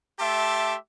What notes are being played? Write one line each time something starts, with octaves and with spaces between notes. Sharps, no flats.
A3 G4 E5 A5 C6 D6